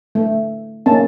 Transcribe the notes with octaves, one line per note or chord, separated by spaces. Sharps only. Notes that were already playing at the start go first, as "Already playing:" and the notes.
A3
A#3 C#4 A5